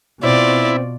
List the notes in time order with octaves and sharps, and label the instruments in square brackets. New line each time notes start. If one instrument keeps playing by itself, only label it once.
[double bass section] B2 [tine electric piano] C4 C5 [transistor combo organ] E4 [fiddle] F4 D5